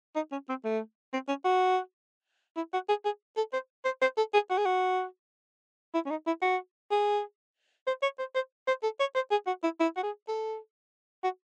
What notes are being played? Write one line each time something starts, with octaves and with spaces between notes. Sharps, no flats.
D#4
C#4
C4
A3
C4
C#4
F#4
E4
F#4
G#4
G#4
A4
C5
C5
C5
A4
G#4
F#4
G#4
F#4
E4
C#4
D#4
E4
F#4
G#4
C5
C#5
C5
C5
C5
A4
C#5
C5
G#4
F#4
E4
E4
F#4
G#4
A4
F#4